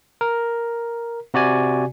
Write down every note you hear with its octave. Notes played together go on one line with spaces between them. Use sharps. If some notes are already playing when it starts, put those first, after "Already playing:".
A#4
C3 F#4 D5 G#5